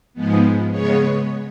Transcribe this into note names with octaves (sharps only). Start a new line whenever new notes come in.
G#2 F3 G#3 B3
C#3 G#3 B3 C#5